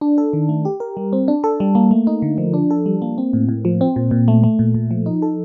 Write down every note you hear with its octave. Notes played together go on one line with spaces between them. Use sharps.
D4
A4
D#3
A3
G4
A#4
G3
C4
D4
A4
G3
A#3
A3
D#4
D3
F3
D4
A4
G3
A#3
C4
A2
A2
F3
C4
A#2
A#2
A3
A3
A#2
A#2
F3
D#4
A4